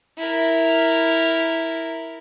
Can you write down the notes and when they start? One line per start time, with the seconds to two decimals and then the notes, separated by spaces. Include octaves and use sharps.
0.18 E4 A#4